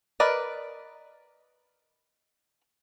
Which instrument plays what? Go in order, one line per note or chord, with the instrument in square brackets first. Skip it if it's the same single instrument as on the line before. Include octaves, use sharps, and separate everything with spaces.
[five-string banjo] A#4 B4 D5 D#5